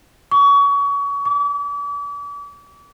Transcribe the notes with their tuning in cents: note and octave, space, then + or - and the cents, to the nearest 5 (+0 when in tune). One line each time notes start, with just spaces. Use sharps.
C#6 +30
D6 -40